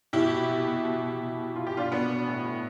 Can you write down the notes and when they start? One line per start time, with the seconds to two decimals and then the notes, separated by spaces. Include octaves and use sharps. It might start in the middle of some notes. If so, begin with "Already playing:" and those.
0.13 B2 E4 G4
0.31 B2
0.49 B2
0.67 B2
0.85 B2
1.03 B2
1.21 B2
1.38 B2
1.56 B2 F4
1.67 G4
1.74 B2 D4 F4
1.92 B2 B3 D4
2.10 B2
2.28 A2
2.45 A2